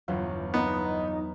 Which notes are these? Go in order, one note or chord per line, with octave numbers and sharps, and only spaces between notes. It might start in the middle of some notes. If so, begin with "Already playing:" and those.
G1 E2 F#3 F4
B3 D#4 A#5